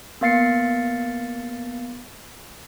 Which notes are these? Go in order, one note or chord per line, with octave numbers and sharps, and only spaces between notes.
A#3 B3 F5 A6 C7 C#7